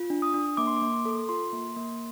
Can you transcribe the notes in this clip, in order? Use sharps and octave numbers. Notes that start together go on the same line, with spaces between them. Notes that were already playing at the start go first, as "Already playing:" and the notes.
Already playing: F4
D4
D#6
D4
A#3 D6
C6
D6
A#3
C6
A4
F4 C6
A#3
A#3